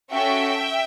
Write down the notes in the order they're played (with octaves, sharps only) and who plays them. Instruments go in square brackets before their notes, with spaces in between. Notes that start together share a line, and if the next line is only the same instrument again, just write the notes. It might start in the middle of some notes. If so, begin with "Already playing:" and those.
[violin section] C#4 F#4 A4 E5 G5